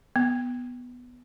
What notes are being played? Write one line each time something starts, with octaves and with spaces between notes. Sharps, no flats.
B3